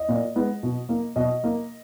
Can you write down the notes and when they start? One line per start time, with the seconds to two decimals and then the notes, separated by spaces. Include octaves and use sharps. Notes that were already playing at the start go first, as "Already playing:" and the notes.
Already playing: D#5
0.09 A#2
0.36 G#3 B3
0.63 B2
0.89 A#3
1.16 B2 D#5
1.44 A#3